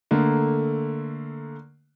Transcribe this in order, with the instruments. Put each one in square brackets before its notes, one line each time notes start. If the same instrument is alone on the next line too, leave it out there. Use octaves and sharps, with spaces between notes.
[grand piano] D3 A3 A#3